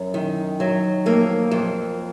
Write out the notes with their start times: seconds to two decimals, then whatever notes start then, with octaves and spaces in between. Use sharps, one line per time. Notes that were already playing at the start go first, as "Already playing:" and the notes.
Already playing: F#2
0.14 D#3
0.60 F#3
1.06 F2 A#3
1.51 F2